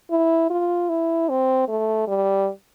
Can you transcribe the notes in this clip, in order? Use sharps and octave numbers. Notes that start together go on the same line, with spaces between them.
E4
F4
E4
C4
A3
G3